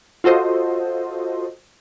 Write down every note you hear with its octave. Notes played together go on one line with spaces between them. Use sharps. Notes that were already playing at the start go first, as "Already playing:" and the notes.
F4 F#4 A4 C5 D#5